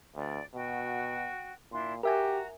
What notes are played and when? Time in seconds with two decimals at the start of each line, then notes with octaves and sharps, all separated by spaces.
0.15 D2 D5
0.54 B2 F#4 G5
1.71 A#2 D4 E4 C6
2.03 F#4 G4 A#4 E5 G#5 A#5